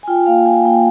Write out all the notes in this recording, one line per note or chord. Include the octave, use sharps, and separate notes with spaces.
G#5
F4 G5
A#3 F5
F4 G#5
A#3 G5